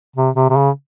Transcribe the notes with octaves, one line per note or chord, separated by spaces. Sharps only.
C3
C3
C3
C#3